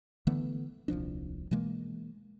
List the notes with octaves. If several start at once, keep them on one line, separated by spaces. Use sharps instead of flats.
D3 E3 A3 B3
D#1 C2 F3 D4
B2 E3 G#3 A#3